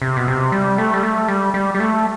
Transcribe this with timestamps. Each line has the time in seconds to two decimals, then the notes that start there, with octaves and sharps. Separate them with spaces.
0.02 C3
0.17 B2
0.28 C3
0.52 G3
0.78 A3
0.94 G3
1.03 A3
1.28 G3
1.54 G3
1.75 G3
1.80 A3